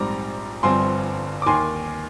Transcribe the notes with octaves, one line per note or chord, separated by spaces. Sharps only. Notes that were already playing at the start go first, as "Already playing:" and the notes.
Already playing: A#1 G#2 G3 C4 A#5 D6
G1 G2 F3 C4 G#5 C6
D6
D#2 D#3 A#3 G#5 C6